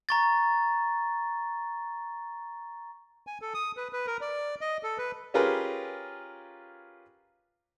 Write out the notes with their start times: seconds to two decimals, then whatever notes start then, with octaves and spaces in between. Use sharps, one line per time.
0.09 A#5 C#6 A6
3.27 G#5
3.41 A4
3.54 D#6
3.77 B4
3.93 B4
4.07 A#4
4.21 D5
4.61 D#5
4.83 A4
4.98 B4
5.34 C#4 F4 G4 G#4 A#4 B4